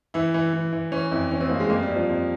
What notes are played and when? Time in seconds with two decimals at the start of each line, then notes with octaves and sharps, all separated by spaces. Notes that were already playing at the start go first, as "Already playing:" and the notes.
0.14 E3 E4
0.34 E3
0.53 E3
0.73 E3
0.92 E3 C#4
1.11 F2 E4
1.31 E3 C#4
1.41 C4
1.50 F2 A#3
1.60 G#3
1.70 F2 A#3
1.82 G3
1.89 F2
1.96 F3
2.09 F2